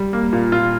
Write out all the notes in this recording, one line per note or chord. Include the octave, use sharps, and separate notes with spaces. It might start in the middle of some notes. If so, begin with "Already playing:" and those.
Already playing: G3
A#3
A#2
A#2 F4